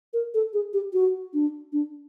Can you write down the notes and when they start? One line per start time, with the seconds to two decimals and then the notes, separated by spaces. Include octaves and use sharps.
0.14 A#4
0.34 A4
0.53 G#4
0.73 G4
0.93 F#4
1.34 D4
1.73 D4